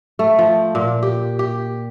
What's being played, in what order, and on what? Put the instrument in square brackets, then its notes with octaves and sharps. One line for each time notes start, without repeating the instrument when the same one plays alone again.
[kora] A3
F3
A#2
G4
G4